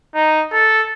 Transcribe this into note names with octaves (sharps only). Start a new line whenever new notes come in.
D#4
A4